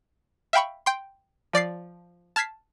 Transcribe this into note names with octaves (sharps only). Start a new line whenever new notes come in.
E5 F5 G5 B5 C#6
G5 C6
F3 D5 A6 C7
A5 F6 G#6 B6 C7